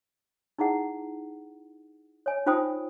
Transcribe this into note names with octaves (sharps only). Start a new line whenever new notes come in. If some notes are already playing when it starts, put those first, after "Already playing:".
D#4 E4 G#4 F#5
C#5 G#5
D#4 F4 C5 G5 G#5 D#6